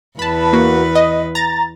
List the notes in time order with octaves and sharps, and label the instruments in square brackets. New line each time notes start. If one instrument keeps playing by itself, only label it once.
[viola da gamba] E2 B4 [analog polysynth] A5 B5
[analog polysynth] A#3 F#4
D#5
A#5 A6